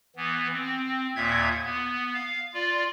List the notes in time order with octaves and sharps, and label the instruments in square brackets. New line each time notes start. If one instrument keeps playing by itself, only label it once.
[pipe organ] E3 B3
C4
D#2 A#2 E5 G#6
B3
F5
F4 D5